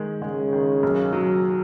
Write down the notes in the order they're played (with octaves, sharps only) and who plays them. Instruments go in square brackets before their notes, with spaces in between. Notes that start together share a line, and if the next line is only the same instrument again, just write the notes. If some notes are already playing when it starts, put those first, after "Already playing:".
Already playing: [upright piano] D#3 G#3
[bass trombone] C#3 [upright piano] G#3
[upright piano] D#3
B1
F#3